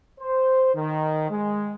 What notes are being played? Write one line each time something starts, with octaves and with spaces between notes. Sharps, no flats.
C5
D#3
G#3